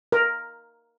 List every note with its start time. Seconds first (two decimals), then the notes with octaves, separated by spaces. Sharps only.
0.12 A#4